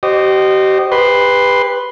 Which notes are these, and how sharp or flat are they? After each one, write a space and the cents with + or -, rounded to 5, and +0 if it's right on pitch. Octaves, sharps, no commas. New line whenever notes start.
G4 -35 C5 +0 D#5 -20
G4 +35 B4 +0 C6 +0